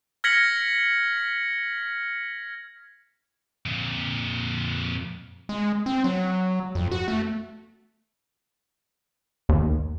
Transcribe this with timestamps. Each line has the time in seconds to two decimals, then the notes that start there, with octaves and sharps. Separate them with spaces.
0.24 F6 G#6 A#6 B6 C#7 F#7
3.66 F2 A#2
5.49 G#3
5.86 C4
6.04 F#3
6.75 F2
6.91 F#4
7.08 A3
9.49 D#2